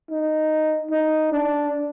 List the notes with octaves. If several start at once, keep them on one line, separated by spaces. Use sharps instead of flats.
D#4
D#4
D4